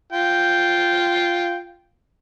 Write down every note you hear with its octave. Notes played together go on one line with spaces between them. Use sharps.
F4 G5